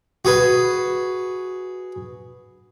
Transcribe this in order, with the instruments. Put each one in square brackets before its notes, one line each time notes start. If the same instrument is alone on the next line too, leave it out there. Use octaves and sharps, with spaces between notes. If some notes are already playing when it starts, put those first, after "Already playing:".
[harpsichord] F#4 G#4 B4